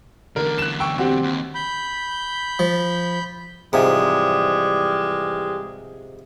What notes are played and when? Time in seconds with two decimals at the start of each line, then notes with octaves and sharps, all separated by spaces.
0.36 E2 D3 A#4
0.59 F#6 E7
0.80 G5 C#6 E6
0.98 C4 F#4 G4
1.22 D#2
1.55 B5 G6
2.59 F3
3.73 G#2 C3 E3 F3 G3 G#3